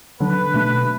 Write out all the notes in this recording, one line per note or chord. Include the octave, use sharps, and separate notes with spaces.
D3 F#3 D4 B4
B2 A3 D4